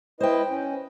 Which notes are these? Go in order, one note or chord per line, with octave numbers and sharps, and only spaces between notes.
E4 B4 C5 D#5 G5
C#4